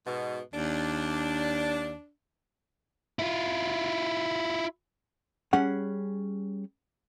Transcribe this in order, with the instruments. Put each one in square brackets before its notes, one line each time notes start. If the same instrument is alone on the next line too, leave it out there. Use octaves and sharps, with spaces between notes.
[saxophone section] G#2 B2
[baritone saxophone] D#2 [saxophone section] D4
[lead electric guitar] E4 F4
[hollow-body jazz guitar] G3 C#4 G#4 F#5